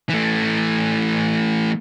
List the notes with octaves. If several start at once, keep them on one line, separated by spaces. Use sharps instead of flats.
E3 A3